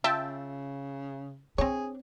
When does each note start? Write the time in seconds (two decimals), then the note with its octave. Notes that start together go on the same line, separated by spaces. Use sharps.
0.04 C#3 F4 E5 G5 A5
1.58 C4 D4 G#4 C#5